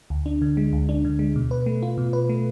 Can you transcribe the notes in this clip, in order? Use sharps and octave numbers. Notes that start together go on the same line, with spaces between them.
D2
D4
D3
G#3
D2
D4
D3
G#3
B2
B4
A3
F4
B2
B4
A3